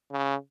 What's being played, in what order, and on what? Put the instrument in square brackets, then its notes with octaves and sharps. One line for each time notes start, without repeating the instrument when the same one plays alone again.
[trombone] C#3